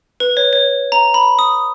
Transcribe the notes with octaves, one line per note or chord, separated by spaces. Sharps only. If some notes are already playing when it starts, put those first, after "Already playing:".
B4
C#5
C#5
A#5
B5
D#6